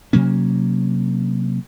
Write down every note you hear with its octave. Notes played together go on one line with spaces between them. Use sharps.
C3 F#3 A#3 C#4